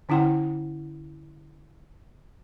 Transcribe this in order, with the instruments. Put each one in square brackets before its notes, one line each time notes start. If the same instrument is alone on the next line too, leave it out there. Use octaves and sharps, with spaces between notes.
[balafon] D3 C#4 E4 F#5 G5 C6